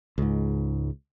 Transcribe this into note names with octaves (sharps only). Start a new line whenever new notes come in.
C#2 G#2